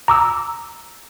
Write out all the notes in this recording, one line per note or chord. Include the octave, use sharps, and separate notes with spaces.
A#5 D6 E6